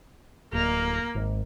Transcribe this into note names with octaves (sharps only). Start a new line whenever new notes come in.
D1 A#3
G#1